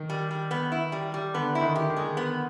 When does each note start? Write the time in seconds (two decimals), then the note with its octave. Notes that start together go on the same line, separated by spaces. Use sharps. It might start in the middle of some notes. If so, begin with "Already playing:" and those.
Already playing: D#3
0.10 G3
0.31 G3
0.51 B3
0.72 E4
0.92 G3
1.14 G3
1.34 D3 B3
1.55 E4
1.61 D#3
1.76 G4
1.90 D#3
1.97 G#3
2.17 B3